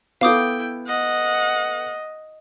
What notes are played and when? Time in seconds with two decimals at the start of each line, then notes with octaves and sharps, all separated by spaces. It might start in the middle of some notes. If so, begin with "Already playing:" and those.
0.21 B3 E4 A4 F5 G5 D6 D#6
0.87 D#5 F#5